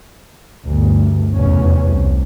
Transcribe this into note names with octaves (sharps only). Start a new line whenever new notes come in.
G1 D2
F1 B1 E2 C#4
C2